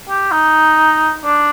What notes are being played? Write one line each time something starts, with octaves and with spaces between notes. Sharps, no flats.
G4
D#4
D4